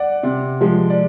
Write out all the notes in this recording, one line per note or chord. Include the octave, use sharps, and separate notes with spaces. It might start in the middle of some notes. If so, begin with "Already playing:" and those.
Already playing: D5 F#5
C3
F3 G#3
D5